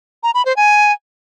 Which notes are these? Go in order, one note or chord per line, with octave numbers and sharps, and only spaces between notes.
A#5
B5
C5
G#5